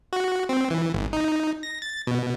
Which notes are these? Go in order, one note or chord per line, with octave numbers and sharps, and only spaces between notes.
F#4
C4
E3
G#1
D#4
A#6
A6
B2